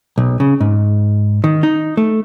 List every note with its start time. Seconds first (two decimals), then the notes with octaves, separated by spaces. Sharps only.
0.18 B1
0.40 C#3
0.60 G#2
1.44 D#3
1.63 D#4
1.97 A3